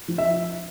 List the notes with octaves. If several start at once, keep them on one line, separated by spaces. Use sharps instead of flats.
F3
E5